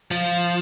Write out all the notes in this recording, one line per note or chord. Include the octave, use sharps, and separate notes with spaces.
F3